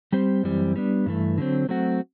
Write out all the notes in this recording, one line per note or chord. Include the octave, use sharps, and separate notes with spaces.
G3 C4 G4 C5
F#2 E3 G3 C4
G3 B3 D4
G2 E3 A3
D3 F#3 C4
F#3 A3 C4 F#4